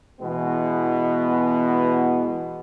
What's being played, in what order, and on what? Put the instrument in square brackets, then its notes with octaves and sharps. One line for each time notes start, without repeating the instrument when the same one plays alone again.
[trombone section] B2 E3 G#3 B3